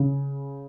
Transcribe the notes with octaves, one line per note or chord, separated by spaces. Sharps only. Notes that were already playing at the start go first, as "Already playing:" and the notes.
Already playing: C#3